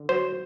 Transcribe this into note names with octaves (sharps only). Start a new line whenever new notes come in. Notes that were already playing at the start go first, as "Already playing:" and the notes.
Already playing: D3
F#3 C5